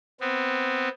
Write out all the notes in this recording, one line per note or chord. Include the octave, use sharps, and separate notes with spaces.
B3 C4